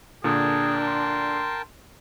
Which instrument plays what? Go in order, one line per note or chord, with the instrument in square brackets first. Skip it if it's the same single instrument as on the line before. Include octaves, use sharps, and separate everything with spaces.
[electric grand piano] A#2 D3 [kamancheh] D4 [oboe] G#4 [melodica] A#4 G5 A5
[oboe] C6